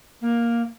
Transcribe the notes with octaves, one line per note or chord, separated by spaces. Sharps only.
A#3